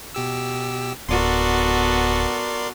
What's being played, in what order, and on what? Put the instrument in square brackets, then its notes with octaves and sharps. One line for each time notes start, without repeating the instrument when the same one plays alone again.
[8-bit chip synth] B2 G4 E6
[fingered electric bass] D1 [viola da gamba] B3 F#4 A4 [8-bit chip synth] A#4 D5 C6